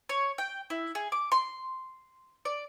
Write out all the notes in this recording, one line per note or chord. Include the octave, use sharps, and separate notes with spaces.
C#5
G5
E4
G#4
D6
C6
D5